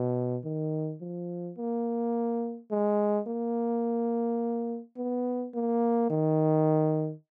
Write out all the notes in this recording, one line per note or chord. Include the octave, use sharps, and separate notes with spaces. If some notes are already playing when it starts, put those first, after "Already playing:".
Already playing: B2
D#3
F3
A#3
G#3
A#3
B3
A#3
D#3